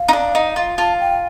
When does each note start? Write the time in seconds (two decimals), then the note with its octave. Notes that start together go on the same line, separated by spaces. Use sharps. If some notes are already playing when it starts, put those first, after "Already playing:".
Already playing: F5
0.08 D#4
0.13 D4
0.35 D#4
0.56 F4
0.78 F4 A5
1.00 G5